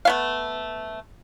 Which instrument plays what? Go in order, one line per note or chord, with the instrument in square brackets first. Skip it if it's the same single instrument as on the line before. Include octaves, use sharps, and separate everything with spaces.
[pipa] A3 B3 F5